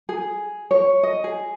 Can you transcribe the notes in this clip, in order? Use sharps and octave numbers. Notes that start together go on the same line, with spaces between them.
G#4
C#5
D#5
G#4